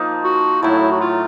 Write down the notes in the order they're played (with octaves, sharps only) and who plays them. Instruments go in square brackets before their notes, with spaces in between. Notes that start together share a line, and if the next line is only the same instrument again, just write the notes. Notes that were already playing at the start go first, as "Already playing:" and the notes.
Already playing: [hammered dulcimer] F3 A#3 D#4
[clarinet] F#4
[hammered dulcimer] A2 F#3 A3 [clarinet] E4
[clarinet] F#4
F4